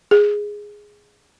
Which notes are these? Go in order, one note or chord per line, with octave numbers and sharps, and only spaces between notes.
G#4